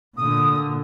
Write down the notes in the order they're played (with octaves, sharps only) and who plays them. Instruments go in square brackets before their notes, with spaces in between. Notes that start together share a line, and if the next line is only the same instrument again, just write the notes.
[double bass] A#2 D3 [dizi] D#6